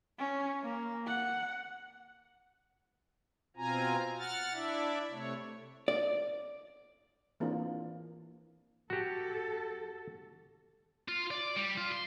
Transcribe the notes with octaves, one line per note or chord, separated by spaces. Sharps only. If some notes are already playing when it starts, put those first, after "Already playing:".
C#4
A#3
F#5
B2 C4 F4 G#5 A#5
F#5 F6 A6
D4 E4 D5 E5
C3 A3 C#5
D5
E3 A#3 C4 D4 F4
F#4 G4 A4
F4
D5
G3
F4
C6